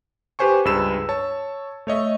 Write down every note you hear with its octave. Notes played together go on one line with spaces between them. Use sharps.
G4 B4 C5 G#5 C#6
C#2 G2 G#4 B4 E6 E7
C#5 A5
A3 C#5 D#5 E5